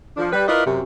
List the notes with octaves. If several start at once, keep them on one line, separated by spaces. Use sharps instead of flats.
F3 D4
G3 B4
E4 F4 A#4 B4 D5 D#5
F#2 C3